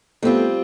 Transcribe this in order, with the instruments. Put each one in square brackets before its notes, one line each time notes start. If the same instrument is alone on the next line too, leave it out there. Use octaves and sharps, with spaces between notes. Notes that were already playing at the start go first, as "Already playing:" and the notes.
[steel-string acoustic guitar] G3 C4 F4 [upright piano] A3 B3